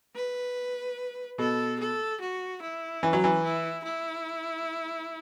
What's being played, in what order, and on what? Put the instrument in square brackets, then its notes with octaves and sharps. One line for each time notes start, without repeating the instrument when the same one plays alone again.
[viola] B4
[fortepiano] B2 [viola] A4
[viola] A4
F#4
E4
[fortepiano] E3 [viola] C#4
[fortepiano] F#3
E3
[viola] E4
E4